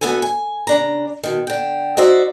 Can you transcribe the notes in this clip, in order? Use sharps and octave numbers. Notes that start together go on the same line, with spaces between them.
D2 G#2 A3 B3 A4 G#5
G#5
C#3 D4 A#5
B2 D#3
D3 G5
D#4 F#4 C5 D5 E5